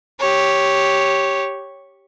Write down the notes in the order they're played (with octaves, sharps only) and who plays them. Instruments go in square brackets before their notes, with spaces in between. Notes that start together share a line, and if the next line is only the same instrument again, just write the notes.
[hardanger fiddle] G4 C#5